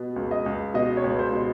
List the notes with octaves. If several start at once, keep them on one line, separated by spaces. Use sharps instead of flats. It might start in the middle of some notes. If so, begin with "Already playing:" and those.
Already playing: B2
C#2
D#5
C#2
B2 D#5
C#5
C#2
C5
B2